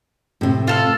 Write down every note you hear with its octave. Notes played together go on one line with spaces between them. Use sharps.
A2 C3
F4 A4 F6